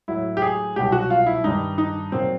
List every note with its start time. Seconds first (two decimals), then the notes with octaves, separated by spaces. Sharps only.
0.08 A2 F#3 E4
0.37 G4
0.42 G#4
0.76 C2 B2 F#3 G4
0.92 F#4
1.10 F4
1.26 E4
1.44 G2 D#3 G3 D#4
1.78 D#4
2.12 A#2 F#3 C4